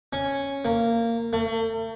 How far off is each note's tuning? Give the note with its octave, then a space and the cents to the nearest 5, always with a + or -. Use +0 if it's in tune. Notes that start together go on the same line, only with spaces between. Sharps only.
C#4 -5
A#3 -20
A3 +40